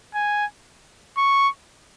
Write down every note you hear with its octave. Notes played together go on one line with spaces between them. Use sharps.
G#5
C#6